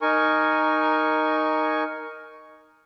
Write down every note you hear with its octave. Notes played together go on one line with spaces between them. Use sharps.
D#4 A#4 G#5 C#6